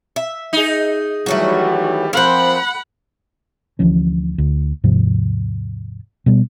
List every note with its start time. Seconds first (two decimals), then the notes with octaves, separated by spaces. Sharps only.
0.16 E5
0.53 D#4 G#4
1.26 D#3 E3 F#3 G3 A3 C#4 F#4
2.13 F3 C4 A#4 C5 F#5 B5
3.79 D2 E3 F3 C#4
4.38 D2
4.84 D#2 G#2 C3 F3
6.26 B2 G3 B3